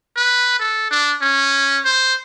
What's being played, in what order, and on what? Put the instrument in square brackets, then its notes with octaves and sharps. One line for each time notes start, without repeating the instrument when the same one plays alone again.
[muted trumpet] B4
A4
D4
C#4
C5